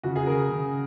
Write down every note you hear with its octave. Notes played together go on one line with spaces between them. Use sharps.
C#3 F#4
G#4
C#3 A#4
C#3